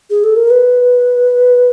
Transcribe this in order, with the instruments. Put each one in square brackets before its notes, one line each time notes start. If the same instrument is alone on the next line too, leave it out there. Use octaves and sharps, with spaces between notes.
[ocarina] G#4
A4
A#4
B4